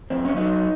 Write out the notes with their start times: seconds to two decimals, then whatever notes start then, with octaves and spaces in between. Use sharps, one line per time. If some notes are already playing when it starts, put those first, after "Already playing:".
0.10 E2 C4
0.25 C#4
0.37 F#3 D#4